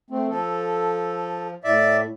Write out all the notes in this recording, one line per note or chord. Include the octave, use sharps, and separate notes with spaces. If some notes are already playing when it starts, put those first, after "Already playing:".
A3 C4
F3 A4
A2 D5 E5